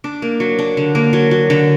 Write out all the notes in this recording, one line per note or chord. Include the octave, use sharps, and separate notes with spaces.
D4
A#3
F#3
D4
D3
A#3
F#3
F#3
D3